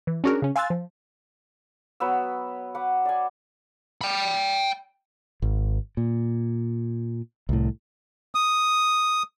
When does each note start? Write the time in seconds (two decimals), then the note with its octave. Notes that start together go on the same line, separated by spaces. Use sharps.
0.07 E3
0.24 C#4 D4 F#4 G#4 A#4
0.42 C#3 C#4
0.56 F5 G#5 C6 E6 F#6 A6
0.70 F3
2.00 F#3 B3 B5 E6
2.75 B4 F#5 D6
3.05 D5 G#5
4.01 G5 B5
5.42 G#1
5.97 A#2
7.49 C2 A2
8.35 D#6